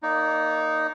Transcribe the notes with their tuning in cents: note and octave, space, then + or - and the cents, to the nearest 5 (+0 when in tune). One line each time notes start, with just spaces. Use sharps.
A#3 +0 D#4 +0 D5 -40